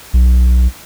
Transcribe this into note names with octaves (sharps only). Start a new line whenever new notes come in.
B1